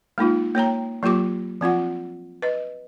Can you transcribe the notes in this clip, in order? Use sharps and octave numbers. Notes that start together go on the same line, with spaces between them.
G#3 A#3 D#4 F4
A#3 C#5 G5 A#5
F#3 A#3 F4 G4 D6
F3 C4 F4 F#5
B4 D#5